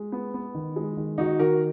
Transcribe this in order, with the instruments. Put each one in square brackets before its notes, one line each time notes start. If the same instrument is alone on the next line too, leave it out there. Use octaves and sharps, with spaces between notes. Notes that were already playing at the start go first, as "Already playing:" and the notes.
Already playing: [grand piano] G#3
B3
B3
D#3
G#3
D#3
D#3 D#4 F#4
D#3 F#4 A#4